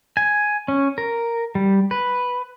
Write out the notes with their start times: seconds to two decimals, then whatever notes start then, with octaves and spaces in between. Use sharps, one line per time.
0.17 G#5
0.68 C#4
0.98 A#4
1.55 G3
1.91 B4